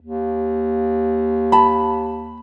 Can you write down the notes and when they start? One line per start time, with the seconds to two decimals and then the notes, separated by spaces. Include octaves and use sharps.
0.02 D#2
1.52 A5 B5